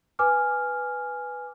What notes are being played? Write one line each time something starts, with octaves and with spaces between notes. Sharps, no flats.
B4 G#5 D6 F6